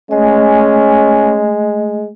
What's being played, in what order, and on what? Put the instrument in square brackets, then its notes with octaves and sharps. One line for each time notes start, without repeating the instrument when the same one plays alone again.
[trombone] G#3 [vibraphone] A3 D#5 [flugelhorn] C#4